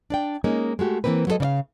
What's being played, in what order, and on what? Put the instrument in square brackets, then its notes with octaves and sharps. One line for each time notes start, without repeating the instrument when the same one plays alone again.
[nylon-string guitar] D4 D5 G5
G#3 A#3 C#4 D#4
G#3 A3 F#4 G4
E3 F3 A#3 C4 B4
F#3 G#3 B3 A4 D#5
C#3 D5 F5